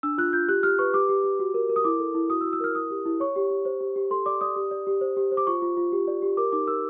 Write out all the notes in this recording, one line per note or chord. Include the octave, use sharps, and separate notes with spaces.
D4 E6
F4 F#6
F4 G6
G4 F#6
G4 F6
B4 C#6
G4 D6
G4
G4
F#4
A#4
A#4
D#6
E4 D6
A4
E4
F#4 D#6
E6
F#4
E6
A#4 F6
E4 D#6
G4
E4
C#5 C#6
G4
G4
C5
G4
G4
A4 C6
D5 D6
D5 D#6
G4
D5
G4
C5
G4
C5
D6
F4 C#6
F4
F4
G4
D5
G4
A#4 D6
D#4 D6
A#4 E6